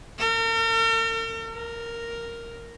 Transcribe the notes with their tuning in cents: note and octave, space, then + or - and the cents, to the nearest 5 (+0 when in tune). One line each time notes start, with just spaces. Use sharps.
A#4 -45
A#4 +0